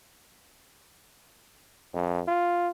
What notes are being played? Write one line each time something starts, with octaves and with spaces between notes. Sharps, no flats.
F2
F4